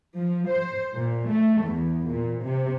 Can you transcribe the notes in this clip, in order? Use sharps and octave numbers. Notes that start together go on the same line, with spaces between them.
F3
C5
A#2
A3
E2
A#2
C3